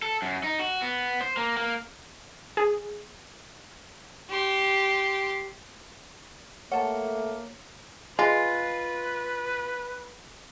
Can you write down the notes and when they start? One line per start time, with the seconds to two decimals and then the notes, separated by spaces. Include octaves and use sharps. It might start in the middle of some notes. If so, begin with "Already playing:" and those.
0.02 A4
0.22 F#2
0.44 D#4
0.59 F#4
0.82 B3
1.21 C5
1.37 A#3
1.57 A#3
2.57 G#4
4.29 G4 C6
6.72 A3 A#3 C#5 F#5 A5
8.19 G#3 F4 B4